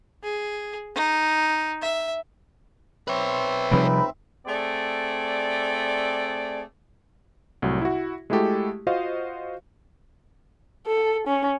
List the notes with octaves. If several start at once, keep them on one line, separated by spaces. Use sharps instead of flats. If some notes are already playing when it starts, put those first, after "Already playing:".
G#4
D#4
E5
C4 B4 C#5 E5
C#2 C3 F3 G3 D#4 B5
A3 C4 G#4 D5
C2 A2 F#3
E4 F#4
G#3 A3 E4 F#4 G4 A4
F4 F#4 C5 D#5 F5
A4
C#4